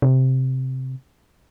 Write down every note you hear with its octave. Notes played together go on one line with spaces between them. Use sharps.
C3